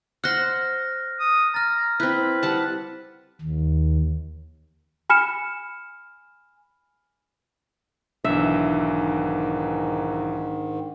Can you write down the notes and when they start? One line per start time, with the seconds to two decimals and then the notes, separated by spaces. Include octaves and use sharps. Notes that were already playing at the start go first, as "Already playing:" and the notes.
0.24 C5 F#5 F6 F#6 A#6
1.20 D#6
1.54 A#5 F6 A6
2.00 C4 E4 B4
2.43 G3 F#5 A5
3.41 D#2
5.10 G#5 B5 F6 C#7 E7
8.24 B1 G#2 D#3 E3 D4 E5